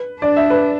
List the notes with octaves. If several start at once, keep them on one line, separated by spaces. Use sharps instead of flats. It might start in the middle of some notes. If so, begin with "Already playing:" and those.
Already playing: B4
D4 D5
E5
B4